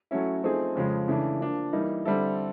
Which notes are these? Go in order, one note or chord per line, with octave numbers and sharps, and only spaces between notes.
F#3 A3 C#4 E4
F3 A3 C4 D#4 G#4
F2 C#3 F3 G#3
C#3 E3 A3 D4
F3 A#3 D4
E3 G3 A#3 D#4
D3 G3 C4 E4 A4